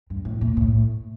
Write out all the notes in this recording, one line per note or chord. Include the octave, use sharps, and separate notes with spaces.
G2
A2
A#2
A2